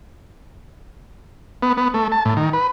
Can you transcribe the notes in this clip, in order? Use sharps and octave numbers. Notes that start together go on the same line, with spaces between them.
B3
B3
A3
A5
A2
D#3
B4